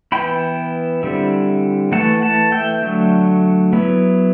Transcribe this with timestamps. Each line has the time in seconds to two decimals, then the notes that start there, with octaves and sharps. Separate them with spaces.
0.12 E3 B3 E4 G5 B5
1.03 D3 G3 C4 E4
1.92 E3 A3 E4 F#5 A5
2.22 F#5 A5
2.52 E5 G5
2.82 D3 F#3 A3
3.73 F#3 B3 E4